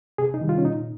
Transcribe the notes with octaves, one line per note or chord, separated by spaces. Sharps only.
C3 G#4
D#4
D#3 G3
F4
C#4
A#2 D#4